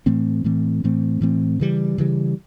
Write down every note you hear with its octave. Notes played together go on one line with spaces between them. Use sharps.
A2 E3 A3 C4
A2 E3 A3 C4
A2 E3 A3 C4
A2 E3 A3 C4
C#3 E3 G3
C#3 E3 G3